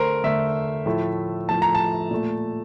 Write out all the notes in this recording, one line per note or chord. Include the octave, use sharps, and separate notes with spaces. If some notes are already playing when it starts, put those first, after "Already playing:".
Already playing: D3 A3 A#4 C5
D3 A3 E5
A2 F3 A3
A2 F3 A3 A5
A#5
A5
A#2 A3